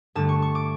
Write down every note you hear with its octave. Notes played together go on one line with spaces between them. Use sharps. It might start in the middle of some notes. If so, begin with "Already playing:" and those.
G2 D3 A3 A5
C#6
C#6
D6